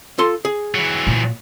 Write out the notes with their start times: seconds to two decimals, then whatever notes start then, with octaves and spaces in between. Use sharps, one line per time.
0.18 F4 A4 C6
0.45 G#4
0.75 E3 F#3
1.07 A#2